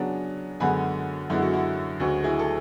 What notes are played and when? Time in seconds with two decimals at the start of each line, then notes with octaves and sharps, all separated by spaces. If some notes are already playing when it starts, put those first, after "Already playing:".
Already playing: C#3 F#3 B3 D4 G#5
0.60 F#2 D3 G#3 B3 G#5 B5
1.30 F#2 D3 G#3 B3 E4
1.42 F#4
1.53 E4
2.00 D2 C#3 G#3 F#4
2.24 E4 G#4
2.39 A4